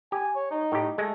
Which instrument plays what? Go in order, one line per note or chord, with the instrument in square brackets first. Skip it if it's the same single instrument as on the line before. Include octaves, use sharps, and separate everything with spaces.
[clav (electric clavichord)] G4 [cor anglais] G#5
[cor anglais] C#5
D#4
[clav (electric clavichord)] A2 G4
[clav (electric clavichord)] G#3 [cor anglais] A3